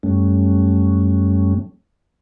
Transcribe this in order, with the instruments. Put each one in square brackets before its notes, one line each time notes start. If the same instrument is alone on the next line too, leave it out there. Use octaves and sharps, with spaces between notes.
[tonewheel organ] F#2 G3 A3 C#4